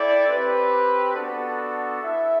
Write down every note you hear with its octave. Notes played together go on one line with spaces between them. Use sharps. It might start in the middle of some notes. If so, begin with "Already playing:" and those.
Already playing: E4 A4 D5 G5
C4 G4 B4
B3 D4 F#4 A4 D5
E4 A4 E5